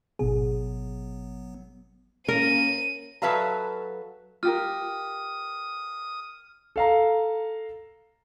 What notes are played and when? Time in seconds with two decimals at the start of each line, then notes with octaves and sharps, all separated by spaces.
0.19 G#1 B2 F#3 B3 G#4
2.28 A#3 C#4 A#4 D#7
3.22 F#3 A4 B4 E5 F5 A#5
4.43 F4 G4 A#4 D#6 F6
6.76 A4 F5 A#5